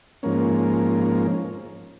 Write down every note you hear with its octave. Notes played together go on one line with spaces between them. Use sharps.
G#2 F3 A#3 C#4